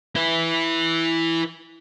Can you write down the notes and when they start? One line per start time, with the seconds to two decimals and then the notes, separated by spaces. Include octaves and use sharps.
0.16 E4 B4